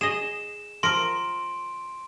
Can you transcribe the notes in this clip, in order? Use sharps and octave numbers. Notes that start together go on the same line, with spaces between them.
G#4 D#5 E7
F3 A#4 C6 D7